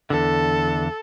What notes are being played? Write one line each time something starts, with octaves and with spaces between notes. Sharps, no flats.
E2 D3 A4